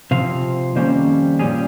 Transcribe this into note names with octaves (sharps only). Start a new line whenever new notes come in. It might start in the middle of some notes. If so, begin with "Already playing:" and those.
C3 F3 C4 F5
F2 D#3 G3 A#3 C#4 C5
A#2 G3 C#4 G#4